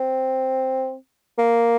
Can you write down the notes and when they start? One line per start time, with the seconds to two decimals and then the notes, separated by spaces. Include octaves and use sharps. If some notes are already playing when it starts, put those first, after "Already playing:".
Already playing: C4
1.38 A#3